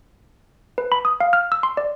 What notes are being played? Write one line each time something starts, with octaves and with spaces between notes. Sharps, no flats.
B4
B5
D#6
F5
F6
E6
C6
D5